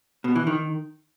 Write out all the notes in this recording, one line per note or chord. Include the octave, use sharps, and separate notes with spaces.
B2
E3
D#3